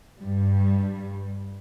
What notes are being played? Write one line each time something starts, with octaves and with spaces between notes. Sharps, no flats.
G2 G3